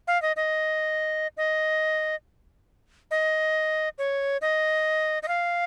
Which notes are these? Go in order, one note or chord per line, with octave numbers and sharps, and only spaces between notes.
F5
D#5
D#5
D#5
D#5
C#5
D#5
D#5
F5